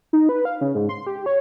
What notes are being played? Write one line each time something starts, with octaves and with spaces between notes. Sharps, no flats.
D#4
B4
F5
C#3
G#2
C6
G4
C#5